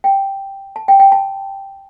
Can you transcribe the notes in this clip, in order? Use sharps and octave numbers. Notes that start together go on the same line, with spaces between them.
G5
A5
G5
G5
A5